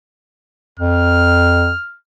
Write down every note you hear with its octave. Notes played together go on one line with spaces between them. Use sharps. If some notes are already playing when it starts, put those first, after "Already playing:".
F2 F6